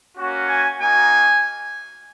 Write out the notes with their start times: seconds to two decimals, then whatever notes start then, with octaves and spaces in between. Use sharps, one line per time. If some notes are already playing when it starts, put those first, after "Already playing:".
0.18 A#3 C#4 F#4
0.48 G#5
0.80 A#3 D#4 F#4 G#5